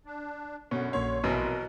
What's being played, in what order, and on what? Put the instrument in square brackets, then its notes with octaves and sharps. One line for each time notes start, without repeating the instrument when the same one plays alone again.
[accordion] D4
[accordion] F#2 D3 [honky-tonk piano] B2 [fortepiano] C#4
[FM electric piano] A#1 A#3 C6 [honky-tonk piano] C#5
[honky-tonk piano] C2 [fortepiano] B2 E3 F#3 [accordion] A#4